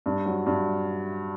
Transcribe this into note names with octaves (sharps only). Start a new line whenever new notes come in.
G2
F#3
G2